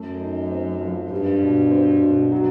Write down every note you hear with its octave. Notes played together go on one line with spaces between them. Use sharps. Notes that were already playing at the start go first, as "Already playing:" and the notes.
Already playing: F#2 A3
D#4
C4
F3
G2 G3
B2
C4
B2
F#3